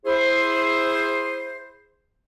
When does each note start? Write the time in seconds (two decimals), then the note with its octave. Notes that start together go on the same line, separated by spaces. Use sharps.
0.05 E4 G#4 C5